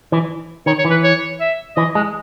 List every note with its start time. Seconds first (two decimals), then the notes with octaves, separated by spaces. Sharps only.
0.12 E3
0.66 D#3 C#5
0.78 C#5
0.85 E3
0.90 B4
1.03 C#5
1.40 E5
1.76 E3 D#5
1.95 G#3